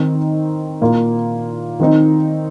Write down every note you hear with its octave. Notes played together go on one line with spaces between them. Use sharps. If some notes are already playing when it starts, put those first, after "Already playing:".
Already playing: D#3 C4 D#4
A#2 A#3 F4
D#3 C4 D#4